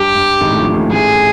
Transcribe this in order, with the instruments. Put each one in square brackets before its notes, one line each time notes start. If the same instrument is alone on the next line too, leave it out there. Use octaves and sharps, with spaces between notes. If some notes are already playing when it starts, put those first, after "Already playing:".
Already playing: [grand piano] G2 [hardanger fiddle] G4
[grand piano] G2
G#1 G#2
A2
A#1 A#2
A1 A2
[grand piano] A1 A2 [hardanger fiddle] G#4